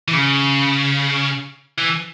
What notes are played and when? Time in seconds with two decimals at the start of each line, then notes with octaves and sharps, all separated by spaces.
0.08 E3
0.13 C#3
1.78 E3